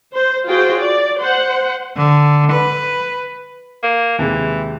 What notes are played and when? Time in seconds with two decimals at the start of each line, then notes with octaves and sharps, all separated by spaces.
0.14 C5
0.48 F4 F#4 G#4 C5 G5
0.79 D5
1.20 C5 F#5
1.97 D3
2.52 B4
3.83 A#3
4.19 D#2 C3 E3 G#3